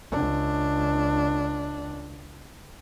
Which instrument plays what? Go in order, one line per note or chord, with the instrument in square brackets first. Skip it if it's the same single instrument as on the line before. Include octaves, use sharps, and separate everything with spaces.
[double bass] C#2 D4